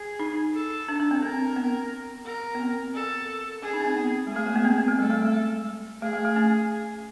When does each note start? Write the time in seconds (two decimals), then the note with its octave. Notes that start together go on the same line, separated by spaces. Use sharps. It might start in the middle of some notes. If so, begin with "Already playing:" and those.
Already playing: G#4
0.20 D#4
0.54 A4
0.89 D4
1.00 D4
1.11 C4
1.22 C4 A#4
1.40 C4
1.56 B3
2.25 A#4
2.55 B3
2.60 C4
2.94 A4
3.62 C#4 G#4
3.73 D#4
3.80 C#4
3.85 C4
3.96 B3
4.27 G#3 G#4
4.36 A3
4.46 A#3
4.55 B3
4.65 C4
4.76 B3
4.88 A3
4.99 G3 A4
5.10 A3
5.22 G#3
6.02 A3 G#4
6.13 A3
6.25 A3
6.36 C#4